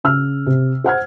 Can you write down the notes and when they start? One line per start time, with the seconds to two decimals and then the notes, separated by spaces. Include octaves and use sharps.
0.04 C#3 E6 F6
0.47 C3
0.84 C5 F#5 F6 G#6